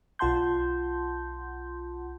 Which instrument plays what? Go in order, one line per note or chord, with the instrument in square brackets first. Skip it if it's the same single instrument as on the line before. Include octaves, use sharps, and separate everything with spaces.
[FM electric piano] B1 F4 F#5 A5 C6 G6